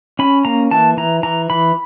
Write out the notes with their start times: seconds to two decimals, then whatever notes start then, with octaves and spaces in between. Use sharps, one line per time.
0.19 C#4 B5
0.45 A#3 A#5
0.71 E3 A5
0.97 E3 A#5
1.23 E3 A#5
1.50 E3 B5